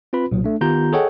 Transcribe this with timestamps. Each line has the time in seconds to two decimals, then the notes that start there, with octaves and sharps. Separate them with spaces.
0.13 C4 F4 B4 B5
0.31 B1 A#2 F#3
0.44 A3 D4
0.61 D#3 B3 F4 G4 A#5 G6
0.93 G#4 A4 C#5 D#5 F#5 G5